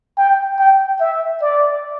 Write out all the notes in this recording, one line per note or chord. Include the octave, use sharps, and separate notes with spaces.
G5
G5
E5
D5